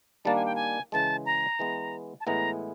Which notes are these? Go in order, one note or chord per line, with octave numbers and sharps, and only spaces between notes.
D#3 G3 A#3 D4 A5
G#5
G5
G#5
C#3 E3 G#3 A5
A#5
E3 G#3 B3
A5
A2 E3 G#3 B3 E4 A#5